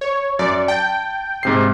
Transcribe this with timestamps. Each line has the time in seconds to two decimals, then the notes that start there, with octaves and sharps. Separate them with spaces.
0.01 C#5
0.39 F#2 D5
0.68 G5 A5
1.43 G#2 C3 C7